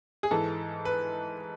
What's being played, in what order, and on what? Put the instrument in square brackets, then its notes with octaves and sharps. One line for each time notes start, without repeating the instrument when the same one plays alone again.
[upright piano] G#4
G#2 E3 A4
B4